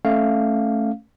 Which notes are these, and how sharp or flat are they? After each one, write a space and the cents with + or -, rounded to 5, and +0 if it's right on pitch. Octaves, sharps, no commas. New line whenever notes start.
A3 -5 C#4 -10 F5 +0